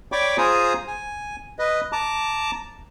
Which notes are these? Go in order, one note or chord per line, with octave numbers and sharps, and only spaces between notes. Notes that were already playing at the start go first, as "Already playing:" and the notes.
C#5 D5 G5 B5 C#6 D6
F4 G#4 C5 G#5 A#5 D#6
G#5
B4 D#5
A5 A#5 D6